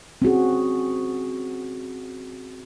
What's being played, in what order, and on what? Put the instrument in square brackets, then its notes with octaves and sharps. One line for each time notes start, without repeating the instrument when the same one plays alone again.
[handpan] C4 C#4 F#4 G#4